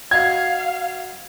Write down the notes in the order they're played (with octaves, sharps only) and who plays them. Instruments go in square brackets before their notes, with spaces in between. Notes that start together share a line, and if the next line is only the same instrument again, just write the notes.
[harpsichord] F#3 D#5 [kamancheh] F5 [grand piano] G#6